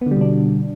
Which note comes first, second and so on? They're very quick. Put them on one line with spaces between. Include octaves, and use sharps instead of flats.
B3 D3 G3 B2 D4